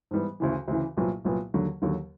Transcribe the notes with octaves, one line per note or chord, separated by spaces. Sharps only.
G#2 E3 G3 B3
D2 C#3 E3
D2 C#3 E3
C2 A#2 F#3 B3
C2 A#2 F#3 B3
D#2 D3 F#3
D#2 D3 F#3